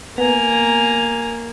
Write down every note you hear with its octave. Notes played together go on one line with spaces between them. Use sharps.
A#3 B3 G#5 A#5